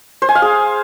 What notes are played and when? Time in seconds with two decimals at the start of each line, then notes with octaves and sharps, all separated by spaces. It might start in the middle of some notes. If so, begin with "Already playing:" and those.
0.22 C5
0.29 G#5
0.35 F5
0.42 G#4